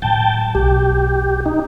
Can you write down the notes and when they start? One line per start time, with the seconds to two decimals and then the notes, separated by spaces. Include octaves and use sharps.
0.02 A2 F#3 G5 A5
0.55 B1 G4
1.46 D#4